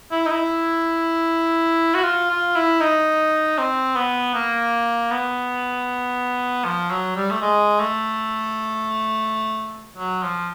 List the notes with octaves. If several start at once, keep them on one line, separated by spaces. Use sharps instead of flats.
E4
D#4
E4
F#4
F4
F4
E4
D#4
C4
B3
A#3
B3
F3
F#3
G3
A3
G#3
A3
F#3
F3